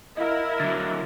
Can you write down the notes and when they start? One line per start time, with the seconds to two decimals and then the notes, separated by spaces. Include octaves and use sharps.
0.17 E4 A#4 D#5 F5
0.60 D3 F#3 A6